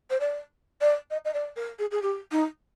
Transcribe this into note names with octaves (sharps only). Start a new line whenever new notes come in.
C5
D5
D5
D#5
D#5
D5
A#4
G#4
G#4
G4
D#4